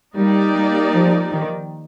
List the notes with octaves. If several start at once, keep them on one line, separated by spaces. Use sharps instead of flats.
G3 A#3 D#4 G4 D5
G3
F3
D#3